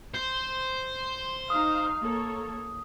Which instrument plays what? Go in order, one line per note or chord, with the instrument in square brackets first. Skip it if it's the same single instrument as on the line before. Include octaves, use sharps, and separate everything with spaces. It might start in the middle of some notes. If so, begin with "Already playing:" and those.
[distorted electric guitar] C5
[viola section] D#4 F5 [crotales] D#6
[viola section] A#3 A4 C#5